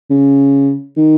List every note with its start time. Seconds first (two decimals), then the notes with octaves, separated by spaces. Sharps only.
0.10 C#3
0.97 D#3